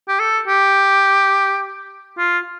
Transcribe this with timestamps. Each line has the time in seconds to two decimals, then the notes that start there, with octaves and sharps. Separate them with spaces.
0.09 G4
0.20 A4
0.48 G4
2.19 F4